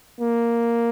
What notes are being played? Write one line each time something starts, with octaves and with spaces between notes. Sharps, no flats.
A#3